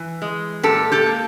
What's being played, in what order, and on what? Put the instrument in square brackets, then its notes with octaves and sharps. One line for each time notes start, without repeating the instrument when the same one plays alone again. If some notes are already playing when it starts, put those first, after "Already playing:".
Already playing: [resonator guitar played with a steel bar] E3
G#3
A#2 G4 A4
G4 A4
A#3